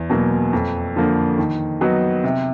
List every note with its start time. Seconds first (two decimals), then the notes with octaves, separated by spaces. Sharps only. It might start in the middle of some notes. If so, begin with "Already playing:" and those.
Already playing: E2
0.10 B2 F#3 A#3
0.53 F2
0.96 D3 F3 A#3
1.38 D#3
1.81 F#3 B3 D#4 F#4
2.24 C3